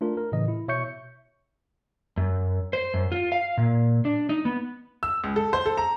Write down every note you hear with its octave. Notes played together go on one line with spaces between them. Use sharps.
A3 D4 F4 A#4
A#4
A2 C#3 E3 D#5
E4
B2 C#5 E5 C#6 G6 C#7
F#2
C5
F#2
F4
F5
A#2
D4
D#4
B3
E6
C#2
A4
C5
A4
A#5